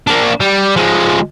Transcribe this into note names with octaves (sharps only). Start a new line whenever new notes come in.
A#3 D4
G3
F3 G#3